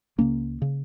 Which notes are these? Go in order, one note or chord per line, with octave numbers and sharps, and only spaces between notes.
C#2 C#3 A#3 C#4
C#3